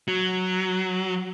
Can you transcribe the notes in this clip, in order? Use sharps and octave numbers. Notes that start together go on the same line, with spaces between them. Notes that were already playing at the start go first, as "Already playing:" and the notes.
F#3